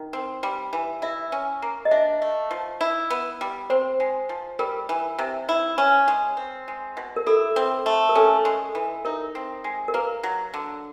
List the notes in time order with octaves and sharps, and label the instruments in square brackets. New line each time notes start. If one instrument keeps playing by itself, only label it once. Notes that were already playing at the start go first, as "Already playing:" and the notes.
Already playing: [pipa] D#3
C4
G3
E3
[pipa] E4 [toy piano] E5
[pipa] C#4
A#3
[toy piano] D#5
[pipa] D4 [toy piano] E5
[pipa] A3
F3
E4
B3
G3
[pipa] C4 [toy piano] C5
[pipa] G#3
F3
[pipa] G3 [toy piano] A#4
[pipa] E3
C3
E4
C#4
G#3
C4
G#3
B2
[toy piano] A#4
[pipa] E4 [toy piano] A4
[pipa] C4
A3
[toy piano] A#4
[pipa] C#4 [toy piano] A4
[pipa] G#3
E3
[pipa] D#4 [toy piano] A#4
[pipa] C4
G#3
[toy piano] A#4
[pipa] A#3 [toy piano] B4
[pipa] F#3
D3